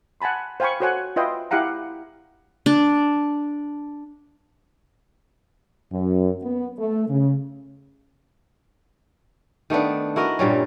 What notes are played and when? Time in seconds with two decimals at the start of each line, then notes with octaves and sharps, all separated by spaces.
0.21 F#5 G#5 A5 B5 C6
0.60 C5 F5 G5 G#5 B5 C#6
0.80 F#4 A4 C5 C#5 F#5 G#5
1.16 F4 B4 D#5 E5 G5 C6
1.51 E4 G4 F5 F#5 A#5
2.66 D4
5.92 F#2
6.42 B3
6.78 A3
7.08 C#3
9.70 D#3 A3 B3 D4
10.16 E4 F#4 A#4 D#5
10.39 G2 A#2 G3 C#4